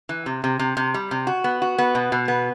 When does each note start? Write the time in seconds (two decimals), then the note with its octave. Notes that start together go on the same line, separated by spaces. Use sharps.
0.09 E3
0.26 C3
0.44 C3
0.59 C3
0.77 C3
0.94 G3
1.11 C3
1.27 F#4
1.44 B3
1.62 F#4
1.78 B3
1.95 B2
2.12 B2
2.28 B3